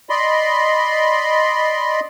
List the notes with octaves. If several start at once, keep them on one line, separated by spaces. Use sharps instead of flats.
D5 D#5 B5 C6